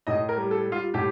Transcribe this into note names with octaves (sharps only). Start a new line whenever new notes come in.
A2 D#5
A#4
G3
A4
G3
F4
A2 G4